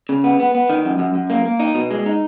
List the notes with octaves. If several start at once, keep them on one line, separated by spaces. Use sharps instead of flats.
C#3
B3
B3
B3
D#3
F#2
F#2
F#2
A#3
A#3
D#4
B2
G#3
D#4